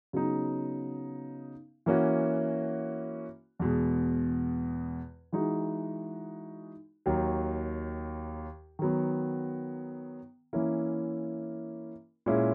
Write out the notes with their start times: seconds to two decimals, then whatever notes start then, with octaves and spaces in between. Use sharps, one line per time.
0.13 C#3 F#3 B3 D#4
1.86 E3 A#3 C#4 F#4
3.59 E2 B2 G#3
5.33 E3 G#3 D#4 F#4
7.06 D#2 D#3 F#3
8.79 D#3 F#3 B3
10.53 E3 A#3 C#4 E4 A#4
12.26 A#2 G#3 C#4 E4 G#4